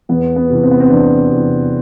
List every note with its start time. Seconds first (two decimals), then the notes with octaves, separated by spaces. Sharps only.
0.09 E2 B3
0.36 B3
0.50 C3 E3
0.63 C4
0.71 B3
0.80 C4
0.90 E2 D4
1.31 C3 E3